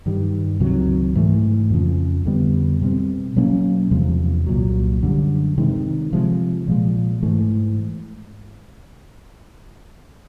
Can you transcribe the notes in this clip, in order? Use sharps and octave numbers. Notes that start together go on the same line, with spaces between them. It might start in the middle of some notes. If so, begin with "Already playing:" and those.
G2 D#3 G3
C#2 C3 D#3 F#3
G#2 E3 A3
F2 C#3 F3
F2 D3 G3 B3
B2 G3 C4
B2 F#3 A#3 C#4
E2 C3 F3 G#3
C2 A#2 F#3
F#2 D3 G3
C3 D#3 G#3
C3 F3 G#3
A#2 F3 G#3
G#2 E3 A3